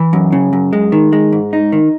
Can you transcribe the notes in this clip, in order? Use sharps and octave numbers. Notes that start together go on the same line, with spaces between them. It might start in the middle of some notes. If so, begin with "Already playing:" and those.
Already playing: E3
F#2
C#3
F#2
G#3
D#3
G#3
G#2
D#4
D#3